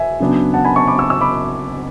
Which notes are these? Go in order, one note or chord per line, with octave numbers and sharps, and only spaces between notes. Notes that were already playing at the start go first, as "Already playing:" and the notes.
Already playing: E5 G#5
C#3 F#3 B3 D4
F#5 A5
G#5 B5
A5 C#6
B5 D6
C#6 E6
C#6 E6
B5 D6